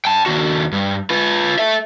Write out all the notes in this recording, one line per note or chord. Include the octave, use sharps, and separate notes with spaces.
G5 A5
D#2 F#4
G2
F4 B4
A4 E5